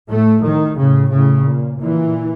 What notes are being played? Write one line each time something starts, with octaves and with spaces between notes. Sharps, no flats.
A2 A3
A2 D#3
A2 C#3
A2 C#3
A#2
A#2 E3